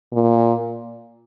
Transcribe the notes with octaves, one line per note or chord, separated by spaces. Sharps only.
A#2